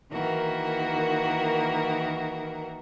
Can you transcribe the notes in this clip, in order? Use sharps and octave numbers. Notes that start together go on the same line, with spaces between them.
D#3 E3 A#3 F#4 A#4